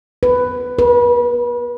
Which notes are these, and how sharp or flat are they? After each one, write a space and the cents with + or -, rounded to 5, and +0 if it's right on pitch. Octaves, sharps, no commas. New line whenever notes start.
B4 +10
B4 -35